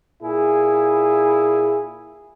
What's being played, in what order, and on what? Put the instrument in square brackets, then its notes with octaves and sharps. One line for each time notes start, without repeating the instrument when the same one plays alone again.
[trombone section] A#2 E4 G#4